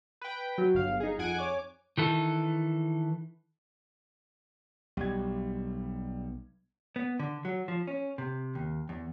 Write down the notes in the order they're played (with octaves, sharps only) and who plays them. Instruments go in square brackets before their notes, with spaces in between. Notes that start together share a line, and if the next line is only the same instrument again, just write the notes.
[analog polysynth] B4 G5
F#3
G1 F5
D#4 G#4
F2 F#5 G#5 D7
C#5 D6
[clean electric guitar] D#3 E3 A4
[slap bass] B1 [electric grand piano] G3 G#6
[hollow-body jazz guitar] B3
D3
F#3
F3
C#4
C3
D#2
E2